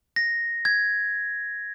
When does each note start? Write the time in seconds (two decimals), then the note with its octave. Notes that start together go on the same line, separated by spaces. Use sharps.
0.16 A#6
0.65 G#6